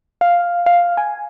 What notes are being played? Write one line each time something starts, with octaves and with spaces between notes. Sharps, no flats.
F5
F5
G#5